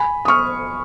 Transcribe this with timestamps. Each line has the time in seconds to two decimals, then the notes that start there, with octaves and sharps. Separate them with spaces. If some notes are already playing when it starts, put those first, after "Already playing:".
Already playing: G#5 B5
0.25 D#6
0.28 C#6 F6